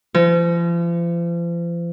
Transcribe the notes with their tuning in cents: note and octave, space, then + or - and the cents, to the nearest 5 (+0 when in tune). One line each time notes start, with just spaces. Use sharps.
F3 -40